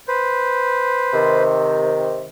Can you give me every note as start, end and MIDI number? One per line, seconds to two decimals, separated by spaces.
0.08 1.43 71
0.08 1.43 72
1.13 2.29 48
1.13 2.29 51